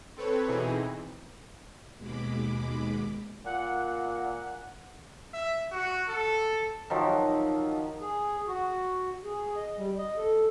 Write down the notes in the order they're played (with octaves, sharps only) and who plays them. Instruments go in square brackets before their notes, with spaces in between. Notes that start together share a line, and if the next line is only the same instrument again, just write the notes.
[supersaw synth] C4 A4 B4 C#5
B2 E3 C4 D#4 E4 G#4
[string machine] D#2 B2 G#3 B5 D6
[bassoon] A#2 [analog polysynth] F#5
[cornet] E5
F#4
A4
[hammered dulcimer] D#3 F3 F#3
[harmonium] G#4
F#4
G#4
D#5
G3
D#5
A4